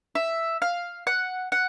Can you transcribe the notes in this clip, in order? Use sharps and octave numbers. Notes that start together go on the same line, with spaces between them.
E5
F5
F#5
F#5